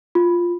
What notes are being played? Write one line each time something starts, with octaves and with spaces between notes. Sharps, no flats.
F4